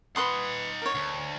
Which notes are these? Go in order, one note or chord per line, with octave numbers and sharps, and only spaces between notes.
D#4 B4 F#5 C6 D#6
A#4 C#5
D2